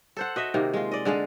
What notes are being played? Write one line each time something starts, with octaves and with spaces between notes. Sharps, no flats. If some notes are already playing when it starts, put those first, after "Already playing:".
A4 C5 F#5
F#4 D#5 E5
C3 D#3 A#3
G#3 F4
D5 D#5
D3 G#3 G#4 F5